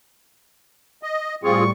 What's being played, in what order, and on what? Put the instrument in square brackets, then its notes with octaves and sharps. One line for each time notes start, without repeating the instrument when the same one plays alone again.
[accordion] D#5
[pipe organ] A2 G3 C#6 [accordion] C4 F4 G#4